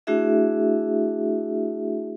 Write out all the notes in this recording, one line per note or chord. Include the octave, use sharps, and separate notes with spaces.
A3 D4 E4 F#4 G#4 E5